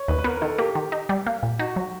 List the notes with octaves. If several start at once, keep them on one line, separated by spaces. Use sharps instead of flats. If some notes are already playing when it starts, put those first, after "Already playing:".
Already playing: C#5
D#2 B4
B4
B3 A#4
A#4
D#3 A4
A#3 G4
D#3
D#4
G3
A#3
A#2
D#4 F#4
F#3